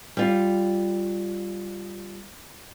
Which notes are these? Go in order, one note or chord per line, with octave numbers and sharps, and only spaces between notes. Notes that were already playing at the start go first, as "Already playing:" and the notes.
G3 F4